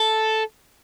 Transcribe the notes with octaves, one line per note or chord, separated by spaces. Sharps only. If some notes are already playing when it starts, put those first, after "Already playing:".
Already playing: A4